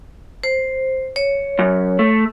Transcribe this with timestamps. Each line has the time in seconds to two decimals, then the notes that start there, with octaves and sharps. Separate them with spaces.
0.44 C5
1.16 C#5
1.59 F#2
1.99 A3